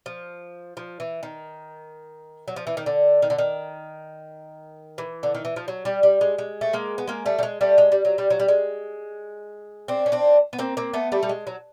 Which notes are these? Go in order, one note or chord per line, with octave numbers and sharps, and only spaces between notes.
F3
F3
E3
D#3
F#3
F3
E3
D#3
D3
D#3
D3
D#3
E3
D3
D#3
E3
F3
F#3
G3
G3
G#3
G#3
A3
G#3 A#3
B3
G#3 A#3
G3 A3
G3
G#3
G3 A3
G#3
G3
F#3
G3
F#3
G3
G#3
C4 D4
C#4
C4 D4
B3
A#3 C4
A#3 C4
A3 B3
G3 A3
G3
G#3
F#3